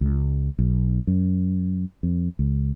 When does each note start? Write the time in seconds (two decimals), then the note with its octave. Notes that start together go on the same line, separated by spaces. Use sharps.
0.01 C#2
0.59 B1
1.07 F#2
2.03 F2
2.39 C#2